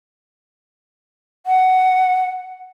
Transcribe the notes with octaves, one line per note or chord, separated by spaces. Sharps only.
F#5